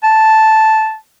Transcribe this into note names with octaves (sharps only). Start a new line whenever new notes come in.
A5